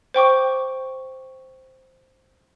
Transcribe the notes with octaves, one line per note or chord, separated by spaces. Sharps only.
C5 G5 C#6 D6